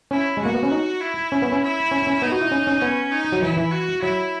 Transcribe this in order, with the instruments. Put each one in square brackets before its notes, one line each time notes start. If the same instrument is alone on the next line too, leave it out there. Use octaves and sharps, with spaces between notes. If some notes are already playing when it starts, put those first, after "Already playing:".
[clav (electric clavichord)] C#4 [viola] E4
[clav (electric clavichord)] G#3
[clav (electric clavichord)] A#3 [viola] F#4
[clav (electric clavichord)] B3
C#4
D#4
[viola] E4
[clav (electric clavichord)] C#4
B3
C#4
[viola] E4
[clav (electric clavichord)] C#4
C#4
[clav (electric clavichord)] B3 [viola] D#4
[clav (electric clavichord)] F#4
E4
C#4
C#4
[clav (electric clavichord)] B3 [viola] C#4
[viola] D#4
[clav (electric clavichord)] F#3
[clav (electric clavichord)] E3 [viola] E4
[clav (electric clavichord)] E3
[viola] F#4
[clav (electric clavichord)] F#3 [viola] E4